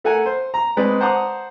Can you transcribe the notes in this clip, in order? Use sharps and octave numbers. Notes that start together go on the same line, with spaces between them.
A3 A4 A#4 F#5 G#5
C5
A#5
G#3 C4 D#4 B4 D5
C5 F#5 A5 A#5 D6 D#6